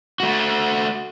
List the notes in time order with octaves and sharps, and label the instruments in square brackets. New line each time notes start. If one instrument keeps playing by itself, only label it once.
[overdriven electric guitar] A3 F#4